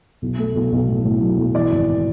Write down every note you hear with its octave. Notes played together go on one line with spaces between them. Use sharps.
B1
A3
B1
B1
A2
A2
F#3
B1
E3 D5
G#1